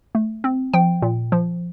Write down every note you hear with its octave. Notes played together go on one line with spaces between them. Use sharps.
A3
C4
F3 G5
A#2
F3